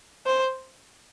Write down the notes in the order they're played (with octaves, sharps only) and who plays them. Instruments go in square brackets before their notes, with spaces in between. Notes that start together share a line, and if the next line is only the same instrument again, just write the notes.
[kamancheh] C5